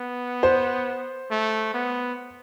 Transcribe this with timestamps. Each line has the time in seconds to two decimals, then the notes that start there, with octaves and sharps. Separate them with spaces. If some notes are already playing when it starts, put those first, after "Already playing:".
Already playing: B3
0.43 C5
1.31 A3
1.74 B3